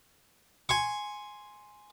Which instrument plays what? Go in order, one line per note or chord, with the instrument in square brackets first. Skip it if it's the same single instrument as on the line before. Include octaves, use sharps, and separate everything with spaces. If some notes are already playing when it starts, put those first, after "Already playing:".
[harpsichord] G#5 C6 C#6